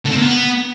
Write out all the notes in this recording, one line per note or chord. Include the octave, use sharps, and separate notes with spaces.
D3
C4
A#3
B3